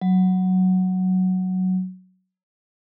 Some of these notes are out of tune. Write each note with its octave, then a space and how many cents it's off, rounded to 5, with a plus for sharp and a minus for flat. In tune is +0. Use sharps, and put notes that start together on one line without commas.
F#3 +0